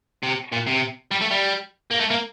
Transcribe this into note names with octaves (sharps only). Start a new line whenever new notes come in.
C3
A#2
C3
G3
A3
G3
A#3
A3
A#3